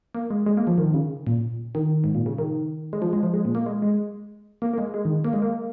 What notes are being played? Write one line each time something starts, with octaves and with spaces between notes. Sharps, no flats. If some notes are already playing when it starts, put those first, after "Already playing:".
A#3
G#3
G#3
A#3
F3
D#3
C#3
A#2
D#3
G#2
A#2
C#3
D#3
G#3
F3
G#3
F3
G#3
A#2
A#3
G#3
G#3
A#3
A#3
G#3
G#3
D#3
A#3
G#3
A#3